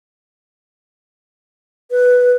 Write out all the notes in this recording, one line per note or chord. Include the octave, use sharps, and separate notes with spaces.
B4